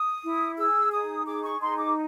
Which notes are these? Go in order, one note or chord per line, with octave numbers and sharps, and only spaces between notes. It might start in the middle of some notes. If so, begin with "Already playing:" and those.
Already playing: D#6
E4
G#4 E6
D#4 D#6
G#4 D6
C#6
D#4 C6
D6